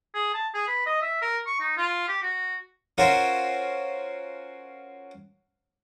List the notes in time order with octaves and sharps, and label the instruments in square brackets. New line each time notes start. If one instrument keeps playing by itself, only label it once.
[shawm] G#4
A5
G#4
B4
D#5
E5
A#4
C#6
D#4
F4
G4
F#4
[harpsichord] C#4 F4 F#4 A#4 C5